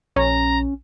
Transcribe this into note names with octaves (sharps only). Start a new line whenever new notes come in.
A#1 C#4 A#5